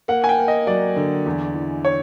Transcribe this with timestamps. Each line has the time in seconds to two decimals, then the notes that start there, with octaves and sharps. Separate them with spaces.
0.08 A#3 F#5
0.24 G#5
0.29 G5
0.39 A#3
0.48 D#5
0.67 F#3 D5
0.96 D3
1.26 E2
1.55 E3
1.85 C#5